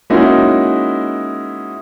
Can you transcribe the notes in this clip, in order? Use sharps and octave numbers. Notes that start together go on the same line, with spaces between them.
G#3 A#3 C#4 D#4 E4 F#4